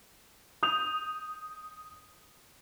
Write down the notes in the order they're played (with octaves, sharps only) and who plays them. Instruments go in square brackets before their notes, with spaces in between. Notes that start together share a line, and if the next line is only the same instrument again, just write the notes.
[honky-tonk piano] D#6 G6 F7